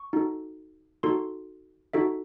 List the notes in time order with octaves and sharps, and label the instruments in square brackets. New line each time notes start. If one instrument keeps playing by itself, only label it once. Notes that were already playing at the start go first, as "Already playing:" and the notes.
Already playing: [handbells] C#6
D#4 F#4 A4
D#4 F#4 A4 C6
D#4 F#4 A4 E5